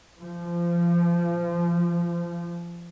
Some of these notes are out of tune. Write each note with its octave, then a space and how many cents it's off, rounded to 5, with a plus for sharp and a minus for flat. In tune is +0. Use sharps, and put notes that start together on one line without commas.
F3 -25